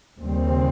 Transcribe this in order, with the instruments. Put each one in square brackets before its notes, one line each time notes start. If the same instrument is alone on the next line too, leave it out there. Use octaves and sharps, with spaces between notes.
[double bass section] D#2 C#3 G3 C4